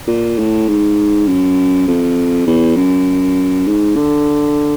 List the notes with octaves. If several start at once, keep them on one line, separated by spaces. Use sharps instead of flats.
A#2
A2
G#2
F#2
F2
E2
F#2
G#2
D3